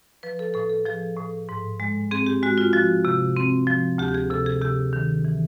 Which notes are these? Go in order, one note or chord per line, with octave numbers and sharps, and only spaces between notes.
F3 B4
A4
A2 A4
A4
F3 G#4
A2
G#2
G#3
C4 G#4
G4
G#3 F#4
F4
F3 F#4
C3
C4
F3
D2 G4
G4
G#4
C3 A4
G#4
C3 G4
D#3
E3